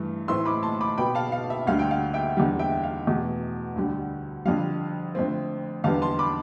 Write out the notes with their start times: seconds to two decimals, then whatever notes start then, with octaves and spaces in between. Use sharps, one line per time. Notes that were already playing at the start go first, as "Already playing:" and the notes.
Already playing: G2 E3 A3
0.28 A2 E3 A3 C4 C6 E6
0.45 B5 D6
0.63 A5 C6
0.81 B5 D6
0.97 B2 B3 G5 B5
1.15 F5 A5
1.32 F5
1.50 E5
1.67 D2 D3 G3 F5
1.79 G5
1.91 F5
2.14 E5 G5
2.37 E2 D3 G3
2.59 E5 G5
2.84 F5
3.07 E2 B2 A3
3.76 D2 D3 G3
4.45 F2 D3 G3 F5
5.15 F2 D3 A3 C4
5.84 E2 D3 G3 B3 F5 A5
6.02 A5 C6
6.19 B5 D6